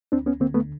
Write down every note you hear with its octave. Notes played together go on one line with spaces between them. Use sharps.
D2 C4 D4
B3 C#4
D3 A#3 C4
A3 B3